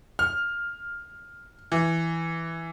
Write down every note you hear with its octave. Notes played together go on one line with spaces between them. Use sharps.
F6
E3